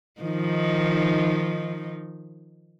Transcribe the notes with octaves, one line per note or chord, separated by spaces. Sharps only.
D#3 F3 D#4